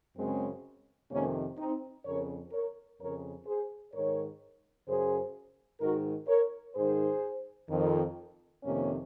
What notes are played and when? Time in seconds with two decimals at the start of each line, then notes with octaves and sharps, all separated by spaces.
0.17 F#2 C#3 G#3 C4
1.12 F2 C3 D#3 A#3 C#4
1.58 C4 D#4
2.05 F2 C#3 A#4 C#5
2.52 A#4 C#5
2.99 F2 C#3 A#4 C#5
3.47 G#4 C5
3.93 G#2 D#3 A#4 C#5
4.87 F#2 C#3 G#4 C5
5.81 G#2 D#3 F#4 A#4
6.28 A#4 C#5
6.75 G#2 D#3 G#4 C5
7.69 F2 D#3
8.63 F2 C3 D#3 A#3 C#4